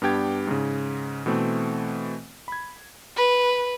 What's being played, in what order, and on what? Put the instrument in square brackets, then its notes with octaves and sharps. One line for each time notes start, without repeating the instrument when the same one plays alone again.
[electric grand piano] G2 B3 D4 G4 G5 G#6
G#2 C#3
B2 E3 A3 C4
B5 G#6
[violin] B4